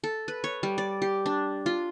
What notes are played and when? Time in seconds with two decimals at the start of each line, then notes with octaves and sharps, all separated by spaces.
0.04 A4
0.28 B4
0.44 C#5
0.63 G3
0.78 D5
1.02 G4
1.26 D4
1.66 F4